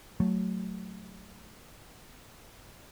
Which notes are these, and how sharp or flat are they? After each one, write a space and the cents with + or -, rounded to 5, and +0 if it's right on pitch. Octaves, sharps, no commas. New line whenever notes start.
F#3 +0 A3 +0